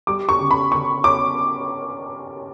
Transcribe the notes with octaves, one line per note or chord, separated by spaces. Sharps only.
G3 D6
C#6
C#3
B5
C#3 C#6
C#4 D6